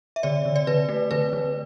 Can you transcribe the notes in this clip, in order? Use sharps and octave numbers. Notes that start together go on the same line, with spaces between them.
E5
D3 D5
D3
D5
D3 B4
A3
D3 B4
D3